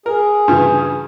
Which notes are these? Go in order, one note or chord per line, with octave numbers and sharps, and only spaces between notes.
G#4 A#4
G2 C#3 E3